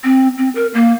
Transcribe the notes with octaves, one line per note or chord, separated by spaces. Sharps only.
C4
C4
A#4
A#3